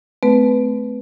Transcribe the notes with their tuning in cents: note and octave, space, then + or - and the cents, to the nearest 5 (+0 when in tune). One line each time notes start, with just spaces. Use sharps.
A3 -25 C4 -40 B4 +0